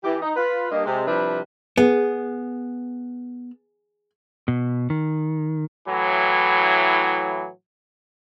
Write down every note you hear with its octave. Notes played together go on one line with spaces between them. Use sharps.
E3 G4
D#4
F4 B4
G2 A#3 D#5
C3 G#3
C3 F3 G3 D4 E4 B4
B3 G#4
B2
D#3
A2 E3 F#3